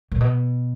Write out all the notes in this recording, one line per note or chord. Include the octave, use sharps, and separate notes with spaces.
A#2
B2